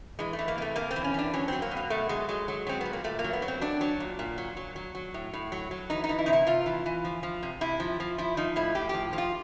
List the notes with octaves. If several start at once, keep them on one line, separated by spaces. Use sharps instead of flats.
E3 G#3
A3
E3
A#3
C3 A3
C3 A#3
C4
E3
C#4
E3 D4
F#3 C#4
F#3 C4
A#3
B2
A#3
B2 A3
F#3 G#3
F#3 G#3
F#3
F#3 C4
A#2 B3
A#3
A#2 A3
A#3
F#3
B3
F#3
C4
F#3 D4
F#3
A#2
A#2
F#3
F#3
F#3
F#3
A2
A2
F#3
F#3
E3 D#4
D#4
E3
E4
C3 D#4
E4
C3 F4
E3
E3
F3
F3
C3
C3 E4
F3
F3
F3 E4
F3 D#4
A2 E4
A2 G4
F3 G4
F3
F4